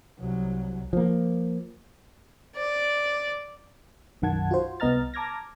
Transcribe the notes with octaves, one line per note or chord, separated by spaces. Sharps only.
C2 F#3
F3 A#3
D5
B1 F#2 D#3 F#5 A5 G#6
F4 F#4 C5
C2 B3 D#5 A#5 F6 A6
A5 A#5 D6 F6 G#6 A#6